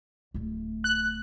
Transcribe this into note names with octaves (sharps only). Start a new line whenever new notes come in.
D1 A3
F#6